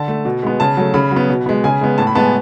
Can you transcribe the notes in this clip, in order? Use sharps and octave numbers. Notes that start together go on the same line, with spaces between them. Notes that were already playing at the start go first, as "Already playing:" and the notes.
Already playing: D3 A5
A3
B2
G#3 B3
C#3 A5
F#3 A3
C#3 B5
F#3
B3
B2
G#3 B3
C#3 G#5
G#3 B3
A2 A5
B5
G#3 B3 A5
G#5